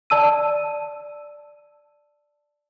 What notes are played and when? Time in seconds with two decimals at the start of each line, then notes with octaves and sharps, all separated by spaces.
0.10 D5 A5 E6 D#7